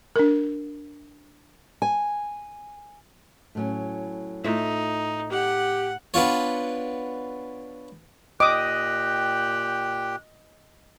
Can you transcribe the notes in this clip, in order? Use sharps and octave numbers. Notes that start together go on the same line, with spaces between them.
D4 A#4
G#5
A2 F#3 C#4
A2 D#4 F4 E5
G4 F#5
B3 D4 F4 C#5
A#2 G4 D#5 G5 D6 D#6 F#6